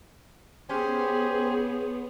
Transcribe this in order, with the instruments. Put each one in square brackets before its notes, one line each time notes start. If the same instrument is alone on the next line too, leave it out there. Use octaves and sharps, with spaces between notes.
[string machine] B3 [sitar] C#4 [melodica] G4 C5 G#5 [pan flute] G#4